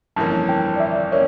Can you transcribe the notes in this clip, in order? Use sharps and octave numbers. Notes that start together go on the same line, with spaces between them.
G1 F2 E3 A#3 C#4 A5
G5
D5
E5
A#3 C#4 C#5